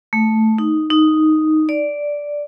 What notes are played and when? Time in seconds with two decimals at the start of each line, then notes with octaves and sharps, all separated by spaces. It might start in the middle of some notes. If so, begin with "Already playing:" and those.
0.13 A3
0.58 D#4
0.90 D#4
1.69 D5